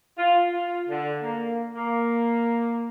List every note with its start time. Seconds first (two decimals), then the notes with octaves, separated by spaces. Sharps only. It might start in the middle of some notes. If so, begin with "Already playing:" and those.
0.17 F4
0.52 F4
0.89 D3
1.22 A#3
1.75 A#3